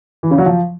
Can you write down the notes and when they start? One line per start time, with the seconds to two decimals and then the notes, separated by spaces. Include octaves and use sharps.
0.23 E3
0.31 C#3
0.38 F#3
0.46 F3